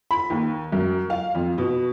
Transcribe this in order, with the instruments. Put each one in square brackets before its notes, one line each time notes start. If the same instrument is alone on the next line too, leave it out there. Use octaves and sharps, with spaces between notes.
[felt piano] B5
D#2
F#2
F5
F2
B2